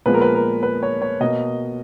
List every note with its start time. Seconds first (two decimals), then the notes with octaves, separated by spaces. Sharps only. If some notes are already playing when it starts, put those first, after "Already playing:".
0.06 A#2 F3 G#3 B3 B4
0.14 A#4
0.21 B4
0.35 A#4
0.63 B4
0.83 C#5
1.02 C#5
1.20 B2 A#3 D#5